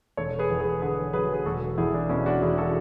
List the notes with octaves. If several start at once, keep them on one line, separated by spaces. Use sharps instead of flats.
E1 A4 C#5
G#4 B4
E2
G#4 B4
D3 G#4 B4
F#3 G#4 B4
G#4
E1 F#4 A4
E2 E4 G#4
D4
B2 C#4 E4
D4 F#4
E1 E4 G#4
F#4 A4